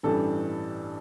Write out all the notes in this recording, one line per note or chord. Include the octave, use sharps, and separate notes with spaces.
A1 G2 E3 G3 A4